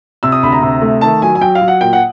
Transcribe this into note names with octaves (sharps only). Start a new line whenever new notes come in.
C3 E6
D#6
D2 B5
A#5
C3
A3
D#3 A5
F#3 G#5
G#5
F#3 G5
F5
F#3
F#5
A#2 G5
F#5